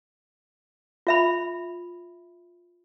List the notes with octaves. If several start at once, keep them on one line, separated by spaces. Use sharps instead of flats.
F4 E5 B5